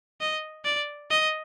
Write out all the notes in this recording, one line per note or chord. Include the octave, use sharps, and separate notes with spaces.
D#5
D5
D#5